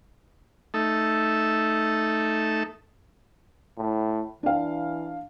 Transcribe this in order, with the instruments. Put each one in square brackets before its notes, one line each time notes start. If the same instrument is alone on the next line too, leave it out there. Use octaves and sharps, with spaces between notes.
[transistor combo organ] A3 D#4 A4 E5
[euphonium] A2
[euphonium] E3 [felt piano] D4 F5